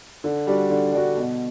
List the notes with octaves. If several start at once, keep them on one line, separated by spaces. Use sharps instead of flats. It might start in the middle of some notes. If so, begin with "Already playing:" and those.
D3
G3 D4 F#4
D3
G3 D4 F#4
B2